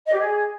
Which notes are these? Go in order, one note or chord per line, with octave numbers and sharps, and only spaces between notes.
D#5
G4
G#4